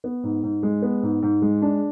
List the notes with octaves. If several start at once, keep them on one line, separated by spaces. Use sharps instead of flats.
B3
G#2
G#2
G#3
B3
G#2
G#2
G#3
D4